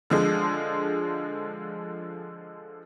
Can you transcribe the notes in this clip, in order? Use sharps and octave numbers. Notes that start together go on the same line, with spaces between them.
D3 F3 G#3